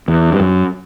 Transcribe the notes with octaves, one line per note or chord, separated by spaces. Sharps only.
E2
G2
F#2